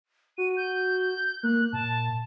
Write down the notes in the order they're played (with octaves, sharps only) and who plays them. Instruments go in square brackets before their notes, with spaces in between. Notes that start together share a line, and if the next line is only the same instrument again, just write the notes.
[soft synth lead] F#4 [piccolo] D#7
[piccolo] G6
[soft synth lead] A#3 [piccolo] F#6
[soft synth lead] A#2 [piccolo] A5